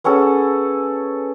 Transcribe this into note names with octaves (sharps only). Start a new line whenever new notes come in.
B3 C#4 G#4 A4